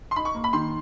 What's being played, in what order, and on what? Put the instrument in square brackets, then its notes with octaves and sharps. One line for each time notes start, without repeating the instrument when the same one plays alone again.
[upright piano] C6
D#4 B5
C#6
A#3
B5
D#3 C6